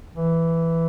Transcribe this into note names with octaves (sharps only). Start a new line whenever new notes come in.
E3